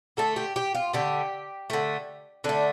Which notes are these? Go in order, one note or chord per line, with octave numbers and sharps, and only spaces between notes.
D3 A3 A4
G4
G4
F4
D3 A3 G4
D3 A3
D3 A3 D4